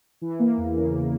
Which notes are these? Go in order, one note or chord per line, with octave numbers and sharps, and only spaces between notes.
E3
A#3
E2
C#3
E3